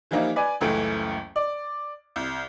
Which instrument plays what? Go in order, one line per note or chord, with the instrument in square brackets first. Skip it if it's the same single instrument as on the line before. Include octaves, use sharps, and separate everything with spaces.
[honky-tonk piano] E3 F3 G3 A#3 D#4 E4
B4 D5 G#5
F#1 C#2 E3 A3 D7
D5
C2